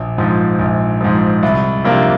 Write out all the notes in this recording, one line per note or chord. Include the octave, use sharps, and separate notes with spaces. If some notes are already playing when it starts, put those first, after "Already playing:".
Already playing: A#1
G#2 F3
A#1
G#2 F3
C2
C3 F3 A#3 D4